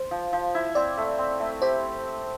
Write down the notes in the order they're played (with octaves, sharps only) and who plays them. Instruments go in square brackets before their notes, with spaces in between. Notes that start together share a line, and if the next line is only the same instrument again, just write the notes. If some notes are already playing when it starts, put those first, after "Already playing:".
Already playing: [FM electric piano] C5
[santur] F3
F3
E4
[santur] C4 [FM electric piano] D5
[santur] A3
C4
A3
[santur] G4 [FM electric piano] C5